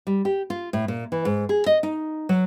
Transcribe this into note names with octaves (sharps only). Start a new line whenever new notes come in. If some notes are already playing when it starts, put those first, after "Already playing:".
G3
G4
F4
A2
A#2
E3
G#2
G#4
D#5
D#4
F#3